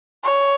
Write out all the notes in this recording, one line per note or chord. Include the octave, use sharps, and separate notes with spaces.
C#5